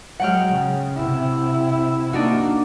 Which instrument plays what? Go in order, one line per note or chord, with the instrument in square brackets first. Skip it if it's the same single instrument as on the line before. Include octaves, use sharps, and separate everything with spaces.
[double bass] F#3 G#3 [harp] F#5 G5 F6
[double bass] C#3
C3 E4
[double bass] A#3 [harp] D4 D#4 F#4